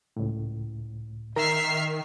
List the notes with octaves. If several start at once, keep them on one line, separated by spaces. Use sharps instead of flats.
C#2 A2
D#3 A#4 E5 A#5 F6 C7